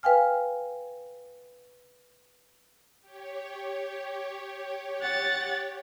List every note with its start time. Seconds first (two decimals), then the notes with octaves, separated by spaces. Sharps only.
0.03 B4 F5 G5 G#5 F6
3.02 G4 C#5
5.02 F#5 A6